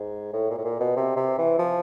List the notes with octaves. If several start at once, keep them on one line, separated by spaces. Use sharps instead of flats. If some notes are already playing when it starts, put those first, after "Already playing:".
Already playing: G#2
A2
A#2
A2
A#2
B2
C3
C3
E3
F3